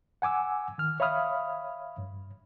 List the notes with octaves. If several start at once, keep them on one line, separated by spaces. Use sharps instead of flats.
F#5 G#5 D6 E6
D#3 F6
C#5 E5 F5 B5 D#6 F6
G2